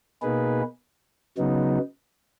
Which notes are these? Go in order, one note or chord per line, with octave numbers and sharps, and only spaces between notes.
B2 A#3 D#4 G#4 B4
C#3 F#3 B3 D#4